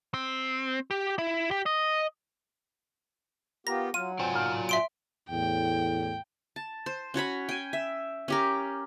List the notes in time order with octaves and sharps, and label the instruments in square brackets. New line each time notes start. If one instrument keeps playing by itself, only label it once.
[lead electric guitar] C4
G4
E4
G4
D#5
[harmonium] B3 F4 G4 [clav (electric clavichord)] A#4 [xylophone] A#6
[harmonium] F#3 [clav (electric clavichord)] F4 [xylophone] D#7
[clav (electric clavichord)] C4 [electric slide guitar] F4 D5 G#5
[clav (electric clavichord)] B1 A#3 F5
[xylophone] E5 C6 D7
[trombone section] E2 A2 [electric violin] G5
[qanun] A5
C5
C#4 F#4 C#5 B5
G5 G#5
E5
C#4 G4 A#4